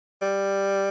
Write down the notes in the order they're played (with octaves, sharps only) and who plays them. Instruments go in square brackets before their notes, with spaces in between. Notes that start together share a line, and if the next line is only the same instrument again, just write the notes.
[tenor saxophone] G3